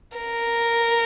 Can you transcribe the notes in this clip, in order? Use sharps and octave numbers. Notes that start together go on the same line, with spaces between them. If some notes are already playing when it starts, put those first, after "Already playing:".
A#4